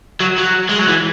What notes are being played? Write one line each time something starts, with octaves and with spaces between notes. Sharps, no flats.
F#3
F#3
G#3
F#3
E3